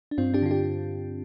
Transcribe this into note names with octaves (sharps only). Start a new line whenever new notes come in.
D4
G2 C4 F4
D4 G4
D3 F4
D4 G4